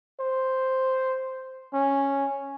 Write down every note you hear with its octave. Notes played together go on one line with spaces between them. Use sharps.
C5
C#4